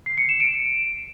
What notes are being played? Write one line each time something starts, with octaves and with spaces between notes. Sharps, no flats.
C7
C#7
E7
D7